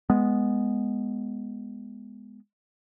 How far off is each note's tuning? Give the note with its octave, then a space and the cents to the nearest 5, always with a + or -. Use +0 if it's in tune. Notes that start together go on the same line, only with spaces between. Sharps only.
G#3 +0 B3 +0